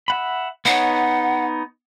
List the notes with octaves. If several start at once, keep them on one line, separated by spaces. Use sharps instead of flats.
E5 F#5 B5
B3 D#4 C#5 F#5